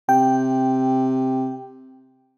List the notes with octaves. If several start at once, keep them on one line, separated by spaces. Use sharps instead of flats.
C3 G5